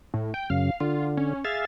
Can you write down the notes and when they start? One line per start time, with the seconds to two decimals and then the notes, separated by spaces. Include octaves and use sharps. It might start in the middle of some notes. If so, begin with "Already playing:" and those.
0.14 A2
0.34 G5
0.50 F#2 C#3 F5
0.80 D3 F4
1.17 C#4
1.45 G#4 E5 F5 A6